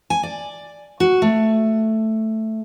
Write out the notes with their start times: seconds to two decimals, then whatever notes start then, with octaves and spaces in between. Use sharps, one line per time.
0.10 G#5
0.23 D5
1.00 F#4
1.22 A3